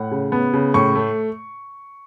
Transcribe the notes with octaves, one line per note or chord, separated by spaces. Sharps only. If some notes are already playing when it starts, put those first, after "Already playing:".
Already playing: A2 F#5
C#3
B3
C#3
A2 C#6
A3